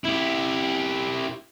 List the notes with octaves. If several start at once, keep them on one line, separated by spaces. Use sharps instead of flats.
E4 G4